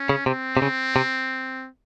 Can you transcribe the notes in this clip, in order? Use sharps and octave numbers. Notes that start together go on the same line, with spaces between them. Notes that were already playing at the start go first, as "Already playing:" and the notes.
Already playing: C#4
C#3
C3 C4
C3
C#3
C3